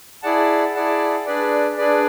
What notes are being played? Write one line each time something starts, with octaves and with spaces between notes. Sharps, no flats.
E4 G#4 D5 F#5 A5
E4 G#4 D5 F#5 A5
D4 G#4 B4 D5
D4 G#4 B4 D5